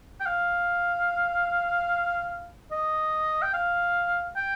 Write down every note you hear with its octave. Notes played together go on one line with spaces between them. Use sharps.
G5
F5
D#5
G5
F5
G5